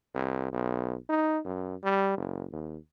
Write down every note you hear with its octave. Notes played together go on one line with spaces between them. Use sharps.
C2
B1
D#4
F#2
G3
F#1
D#2